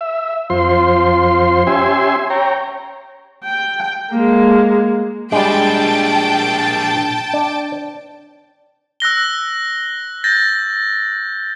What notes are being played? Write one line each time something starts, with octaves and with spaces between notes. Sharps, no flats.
E5
F2 F4 C5 C6
C#4 G4 E5 G#5 C6
C#5 G5 A#5
G5
G#3 A#3
A#2 G3 G#3 D4 G5 A5
D4
E6 F#6 A#6 G7
G6 A6 A#6